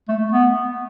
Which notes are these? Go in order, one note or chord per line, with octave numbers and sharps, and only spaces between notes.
A3
B3